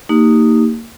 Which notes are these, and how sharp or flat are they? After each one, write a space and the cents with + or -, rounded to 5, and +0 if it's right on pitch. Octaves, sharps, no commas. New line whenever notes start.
A#3 -25 D#4 -5 G4 +0